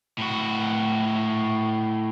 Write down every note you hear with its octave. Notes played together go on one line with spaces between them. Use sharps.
A2 F#4